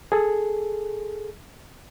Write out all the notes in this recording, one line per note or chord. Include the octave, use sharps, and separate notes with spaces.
G#4 A4